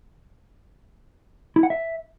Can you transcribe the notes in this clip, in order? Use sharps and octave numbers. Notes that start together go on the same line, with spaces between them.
E4
F#5
E5